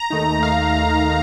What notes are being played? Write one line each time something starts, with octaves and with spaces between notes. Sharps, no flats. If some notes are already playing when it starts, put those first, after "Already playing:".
Already playing: A#5
D#2 D#3 A3 D#4
D#3 A3 D#4 F5